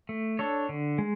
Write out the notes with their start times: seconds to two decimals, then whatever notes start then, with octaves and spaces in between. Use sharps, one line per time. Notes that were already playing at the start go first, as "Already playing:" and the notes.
0.09 A3
0.39 D4 A4 C#5
0.69 D3
0.98 G#3